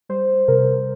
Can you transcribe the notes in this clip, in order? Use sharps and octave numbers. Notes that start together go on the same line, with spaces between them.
G3 C5
C3 A#4